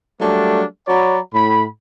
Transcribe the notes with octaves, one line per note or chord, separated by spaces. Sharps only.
F#3 G3 A3 A#3 D4
F#3 F#4 C#5 D5 A#5 B5
A2 B5